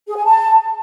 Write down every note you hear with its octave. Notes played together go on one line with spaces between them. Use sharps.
G#4
G#5
A5